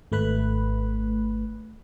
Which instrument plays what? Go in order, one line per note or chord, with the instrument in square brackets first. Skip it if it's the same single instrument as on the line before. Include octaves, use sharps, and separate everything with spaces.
[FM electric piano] G#1 A3 B4 B5 F#6